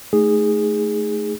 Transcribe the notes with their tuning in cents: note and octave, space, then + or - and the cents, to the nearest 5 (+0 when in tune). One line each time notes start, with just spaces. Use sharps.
A3 -10 D#4 +0 G#4 -10